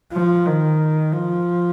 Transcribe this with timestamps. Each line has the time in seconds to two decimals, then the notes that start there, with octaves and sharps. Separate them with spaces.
0.12 F3
0.46 D#3
1.12 F3